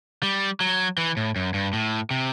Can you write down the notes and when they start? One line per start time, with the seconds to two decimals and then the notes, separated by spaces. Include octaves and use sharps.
0.23 G3
0.61 F#3
0.98 E3
1.17 A2
1.36 F#2
1.54 G2
1.73 A2
2.11 C3